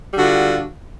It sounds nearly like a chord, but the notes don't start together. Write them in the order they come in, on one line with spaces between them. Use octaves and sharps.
G3 D3 F#4 F4